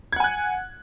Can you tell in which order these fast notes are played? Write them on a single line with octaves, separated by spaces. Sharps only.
G#6 F#5 G#5 F#6